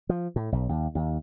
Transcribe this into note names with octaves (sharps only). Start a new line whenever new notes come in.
F3
A2
B1
D#2
D#2